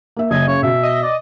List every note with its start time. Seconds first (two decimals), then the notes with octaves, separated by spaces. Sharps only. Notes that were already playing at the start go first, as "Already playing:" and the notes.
0.17 A#3 E5
0.31 F#1 D#5 E5 G#5
0.47 C#3 C#5
0.63 B2 E5
0.83 D#5
1.03 D5